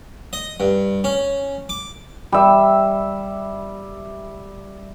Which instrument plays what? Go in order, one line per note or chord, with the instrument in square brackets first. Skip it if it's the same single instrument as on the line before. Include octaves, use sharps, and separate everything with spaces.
[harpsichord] D#5
G2
C#4
D6
[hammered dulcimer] G3 E5